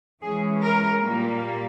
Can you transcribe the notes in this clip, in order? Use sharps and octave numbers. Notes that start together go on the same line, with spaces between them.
E3 G#3 C#4 G#4
A#4
A#2 G3 A#3